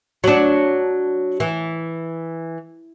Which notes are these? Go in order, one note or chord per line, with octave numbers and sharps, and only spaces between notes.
F#3 D4
E3